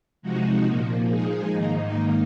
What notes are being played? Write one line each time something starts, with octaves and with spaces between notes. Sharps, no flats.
C3 F3 G#3 D#4 F#4
A#2 F3 A#3
F3 G#3 D#4 G#4
G#2 D#3 A#3 D#4